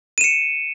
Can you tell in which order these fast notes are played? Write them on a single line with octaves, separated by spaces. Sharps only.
D#7 E7 C#7